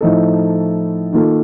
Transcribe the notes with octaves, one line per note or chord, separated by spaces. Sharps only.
A2 F3 A3 D#4 A4
D#3 A#3 F4 A4